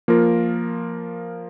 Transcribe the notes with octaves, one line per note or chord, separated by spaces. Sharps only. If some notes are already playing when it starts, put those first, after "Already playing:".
F3 A#3 F4 A#4